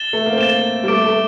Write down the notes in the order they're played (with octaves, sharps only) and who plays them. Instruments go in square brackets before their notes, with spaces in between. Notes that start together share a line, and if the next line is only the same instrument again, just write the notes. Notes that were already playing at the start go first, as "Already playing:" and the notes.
Already playing: [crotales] A6 E7 G7
[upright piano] A3
A#3
C4
[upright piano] A#3 [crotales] A6 E7 G7
[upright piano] G3
[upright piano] A3 [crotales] D6 A6 D7
[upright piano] A3